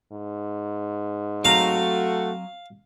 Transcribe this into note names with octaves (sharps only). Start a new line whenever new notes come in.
G#2
F#3 A3 C4 F#4 F5 A#5